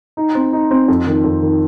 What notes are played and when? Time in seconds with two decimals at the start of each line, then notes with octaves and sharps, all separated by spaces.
0.17 D#4
0.35 C4
0.53 D#4
0.71 C4
0.88 F2
1.07 D#3
1.24 F2
1.42 D#3